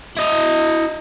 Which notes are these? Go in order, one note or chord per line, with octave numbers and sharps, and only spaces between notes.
E4 D#5